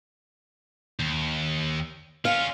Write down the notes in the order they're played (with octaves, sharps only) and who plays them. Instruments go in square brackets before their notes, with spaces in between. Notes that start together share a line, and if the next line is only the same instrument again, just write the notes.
[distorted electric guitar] D#2
[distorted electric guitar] C#4 F4 [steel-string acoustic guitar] F5